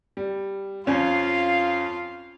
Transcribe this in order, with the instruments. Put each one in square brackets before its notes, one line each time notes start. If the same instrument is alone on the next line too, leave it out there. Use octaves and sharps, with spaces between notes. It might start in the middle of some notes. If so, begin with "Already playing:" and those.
[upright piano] G3
[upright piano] F2 C#4 [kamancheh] F4 F5